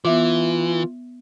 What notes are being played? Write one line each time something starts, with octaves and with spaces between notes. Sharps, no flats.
E3 B3 F4 E5 D6